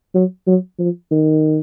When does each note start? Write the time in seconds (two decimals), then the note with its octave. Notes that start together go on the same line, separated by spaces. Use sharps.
0.14 F#3
0.47 F#3
0.79 F3
1.11 D#3